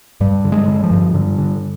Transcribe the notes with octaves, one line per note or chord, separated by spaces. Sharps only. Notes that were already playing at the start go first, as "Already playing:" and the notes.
G2 G3
D3
G#3
D3
F3
G2
G2 D3
D3